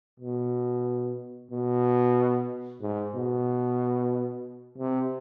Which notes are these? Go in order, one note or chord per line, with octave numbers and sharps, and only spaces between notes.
B2
B2
G#2
B2
C3